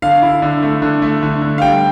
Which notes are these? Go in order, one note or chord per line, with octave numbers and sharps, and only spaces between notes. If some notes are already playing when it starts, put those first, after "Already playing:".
D3 F5
E4
D3
A3
D3
A3
D3
D3
F5
G3 G5